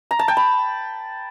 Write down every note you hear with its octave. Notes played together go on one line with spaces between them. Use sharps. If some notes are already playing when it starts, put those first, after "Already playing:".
A#5
A5
G5
B5